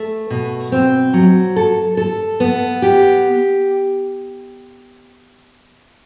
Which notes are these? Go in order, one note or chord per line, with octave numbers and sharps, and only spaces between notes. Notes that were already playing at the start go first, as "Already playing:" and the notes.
Already playing: A3
B2
C4
F#3
A4
A4
B3
G4